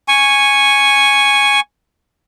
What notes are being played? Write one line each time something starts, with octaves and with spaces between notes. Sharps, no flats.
G#5 C#6